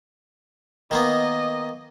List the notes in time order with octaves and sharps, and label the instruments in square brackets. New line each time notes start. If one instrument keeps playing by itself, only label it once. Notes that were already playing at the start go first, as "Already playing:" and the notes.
[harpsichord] D#3 A#3 B3 [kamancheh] D#5